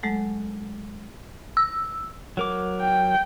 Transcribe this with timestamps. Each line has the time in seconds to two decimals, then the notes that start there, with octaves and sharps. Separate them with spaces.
0.03 F#3 G#3 A3 A4 F#5
1.57 E6
2.37 F#3 A#4 D6
2.81 G5